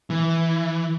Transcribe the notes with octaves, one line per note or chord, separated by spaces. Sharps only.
E3